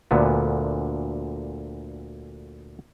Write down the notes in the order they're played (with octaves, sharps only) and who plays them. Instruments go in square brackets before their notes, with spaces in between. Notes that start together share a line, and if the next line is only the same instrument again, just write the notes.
[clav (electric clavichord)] D2 A#2 D3 B3